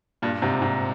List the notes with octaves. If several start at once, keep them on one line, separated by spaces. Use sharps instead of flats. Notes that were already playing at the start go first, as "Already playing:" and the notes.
G2 A#2
G#2 C3
G#2